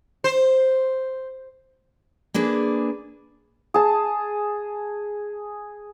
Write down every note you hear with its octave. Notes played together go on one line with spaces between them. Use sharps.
C5
A#3 D4 G#4 B4
G#4 A5